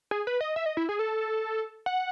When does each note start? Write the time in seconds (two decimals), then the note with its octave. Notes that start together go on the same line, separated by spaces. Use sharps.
0.11 G#4
0.27 B4
0.41 D#5
0.56 E5
0.66 D#5
0.77 E4
0.89 G#4
0.99 A4
1.86 F#5